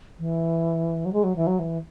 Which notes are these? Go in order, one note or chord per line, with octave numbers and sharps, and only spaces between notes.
E3
F#3
G#3
F#3
E3
F#3
E3